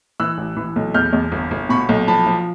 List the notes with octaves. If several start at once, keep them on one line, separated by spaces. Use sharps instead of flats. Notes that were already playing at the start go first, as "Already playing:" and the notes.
E3 E6 F#6
A1
E3
B1
E2 F6 G6
E2
G1
G1
B2 B5 C#6
B1
F3 A5 B5
F3